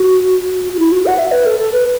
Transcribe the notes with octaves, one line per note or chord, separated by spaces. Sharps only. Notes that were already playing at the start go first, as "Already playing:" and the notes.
Already playing: F#4
F#4
E4
F#4
F#5
E5
B4
A4
A4
B4